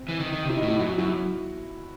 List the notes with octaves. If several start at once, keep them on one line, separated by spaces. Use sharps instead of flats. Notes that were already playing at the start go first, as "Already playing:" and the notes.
Already playing: C4
E3
D#3
D#3
C3
E4
D#4
A2
E4
F#2 F#4
F#2 E4